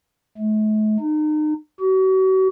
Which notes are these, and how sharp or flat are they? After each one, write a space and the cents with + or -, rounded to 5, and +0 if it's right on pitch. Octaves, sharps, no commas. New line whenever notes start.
A3 -45
D#4 -35
F#4 +40